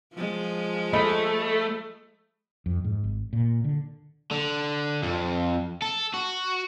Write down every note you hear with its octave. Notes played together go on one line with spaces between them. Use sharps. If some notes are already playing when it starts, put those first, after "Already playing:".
F3 G#3
A3 D#5 B5
F2
G#2
G#1
A#2
D3
D3
F2
A4
F#4